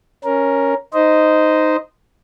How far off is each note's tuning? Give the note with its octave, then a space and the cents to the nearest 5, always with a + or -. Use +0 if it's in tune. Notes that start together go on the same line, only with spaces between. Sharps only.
C#4 +0 A#4 +5
D#4 +0 C5 -15 D#5 +0